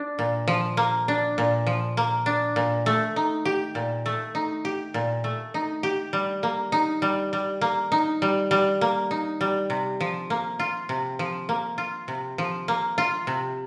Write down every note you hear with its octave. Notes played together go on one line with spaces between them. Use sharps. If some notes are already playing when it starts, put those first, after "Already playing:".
Already playing: D4
A#2
F3
A#3
D4
A#2
F3
A#3
D4
A#2
A3
D#4
G4
A#2
A3
D#4
G4
A#2
A3
D#4
G4
G3
A#3
D#4
G3
G3
A#3
D#4
G3
G3
A#3
D#4
G3
C3
F3
A#3
F4
C3
F3
A#3
F4
C3
F3
A#3
F4
C3